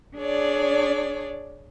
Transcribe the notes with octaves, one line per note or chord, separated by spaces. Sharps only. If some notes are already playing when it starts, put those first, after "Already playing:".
D4 G#4 C#5 D5